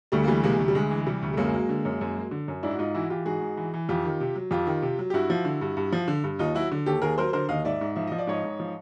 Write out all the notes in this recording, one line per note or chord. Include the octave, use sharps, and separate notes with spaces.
D2 G3 A3
A#3
E3 G3 A3
C3 G#3 A#3
D2
G3
D2 G#3
E3
C3 G3
D2
A3
F#2 G#3 A#3
F#3
D3
F#2
F#2
F#3
D3
F#2
G#2 D4 E4
F#4
G#2 D#4 F4
E3 E4 F#4
E3 F4 G4
G#2 F#4 G#4
G#2
E3
E3
F2 F4 G4
D#3
C3
F#3
F2 F4 G4
D#3
C3
F#3
G4
G2 E4 F#4
F3
D3
G2
G2
F3
D3
G2
D#2 D#4 F4
F#3 E4 F#4
D3
D#2 G4 A4
D#2 G#4 A#4
F#3 A#4 C5
D3 A#4 C5
D#2 D#5 F5
G#2 D5 E5
G#2
F3 E5
F3 D#5
D5
G#2 C#5 D#5
G#2
F3